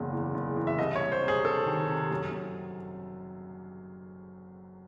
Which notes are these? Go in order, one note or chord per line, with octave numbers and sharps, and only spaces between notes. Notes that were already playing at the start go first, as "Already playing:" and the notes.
Already playing: F#1 E2 C#3
E3
F#1
E3
E5
C2 D#5
C#5
C2
C5
C3
G#4
C3 A4
D#3
C3
F#2
F#2